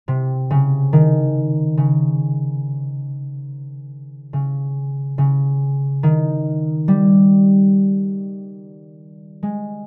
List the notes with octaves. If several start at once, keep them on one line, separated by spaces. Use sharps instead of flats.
C3
C#3
D#3
C#3
C#3
C#3
D#3
G3
G#3